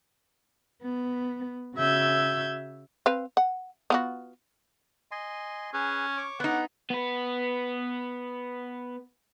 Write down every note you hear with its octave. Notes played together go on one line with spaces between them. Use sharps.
B3
C#3 F#4 E5 E6 G6 G#6
C4 B4 F5
F#5
B3 F4 F#4
D#5 G#5 C6
C#4 G#4 B4
C#5 C#6 D6
B3 D#4 F#5
B3 B4